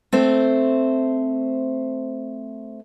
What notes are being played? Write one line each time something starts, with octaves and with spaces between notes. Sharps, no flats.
A3 C4 C5